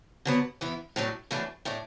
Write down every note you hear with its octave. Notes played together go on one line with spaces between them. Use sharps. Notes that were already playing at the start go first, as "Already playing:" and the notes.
D3 F#3 B3
E2 E3 B3 E4
A2 F#3 A3 D4
F#2 E3 A3 D4
A2 A3 D4